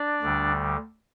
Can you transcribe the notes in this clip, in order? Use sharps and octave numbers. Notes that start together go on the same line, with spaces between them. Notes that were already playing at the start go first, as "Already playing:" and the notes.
Already playing: D4 D5
D2 D3 G3